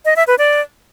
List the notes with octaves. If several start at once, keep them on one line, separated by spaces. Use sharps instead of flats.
D#5
E5
B4
D5